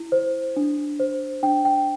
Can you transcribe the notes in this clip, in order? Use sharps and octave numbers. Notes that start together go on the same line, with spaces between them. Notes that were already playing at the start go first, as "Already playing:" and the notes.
Already playing: E4
C5
D4
C5
D4 G5
G5